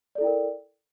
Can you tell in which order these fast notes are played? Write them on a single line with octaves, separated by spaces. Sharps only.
D5 A4 E4 G5 A#4